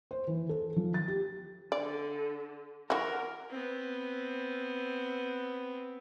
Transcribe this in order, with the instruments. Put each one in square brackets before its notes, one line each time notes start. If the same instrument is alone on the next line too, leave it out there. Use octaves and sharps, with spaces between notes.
[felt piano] C5
E3
A4
F3
A6
G4
[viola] D3 [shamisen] D5
[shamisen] E3 F#4 [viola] A#4
[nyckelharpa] B3 C4